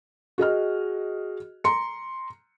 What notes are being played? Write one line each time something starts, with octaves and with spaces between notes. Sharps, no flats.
F#4 G#4 D#5 F6
A#5 C6 C#7